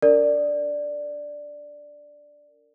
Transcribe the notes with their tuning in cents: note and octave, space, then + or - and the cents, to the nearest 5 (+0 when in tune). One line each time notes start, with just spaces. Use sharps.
D4 -25 A#4 -25 D5 +0